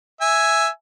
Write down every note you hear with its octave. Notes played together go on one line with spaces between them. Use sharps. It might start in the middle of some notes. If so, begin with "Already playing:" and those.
E5 G#5